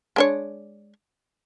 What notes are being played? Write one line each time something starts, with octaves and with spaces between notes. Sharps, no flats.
G#3 D4 C#5